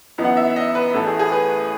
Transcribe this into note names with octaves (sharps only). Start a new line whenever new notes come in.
F#2 E3 B3 D#4
F#5
E5
D#5
B4
A1 A2 E3 A4
G#4
G#4
B4